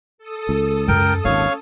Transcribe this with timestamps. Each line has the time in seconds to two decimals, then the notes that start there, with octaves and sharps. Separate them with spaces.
0.18 A4 D#6
0.49 C#2
0.88 F#2 A#4 G5
1.25 G#1 D#2 A#2 C#4 C#5 F5